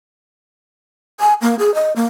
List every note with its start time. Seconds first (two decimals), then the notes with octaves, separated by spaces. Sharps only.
1.20 G#5
1.42 A#3
1.59 G#4
1.75 D#5
1.96 A#3